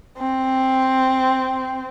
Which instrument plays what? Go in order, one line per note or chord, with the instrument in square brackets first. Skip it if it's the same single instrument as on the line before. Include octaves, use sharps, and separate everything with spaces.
[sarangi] C4